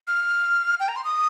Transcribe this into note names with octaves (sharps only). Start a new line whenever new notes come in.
F6
G5
A#5
C6
D#6